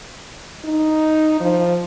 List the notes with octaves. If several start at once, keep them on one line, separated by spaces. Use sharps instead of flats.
D#4
F3